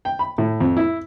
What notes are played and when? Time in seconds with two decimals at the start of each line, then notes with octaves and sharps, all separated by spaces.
0.05 G5
0.19 B5
0.38 A2
0.60 F2
0.77 E4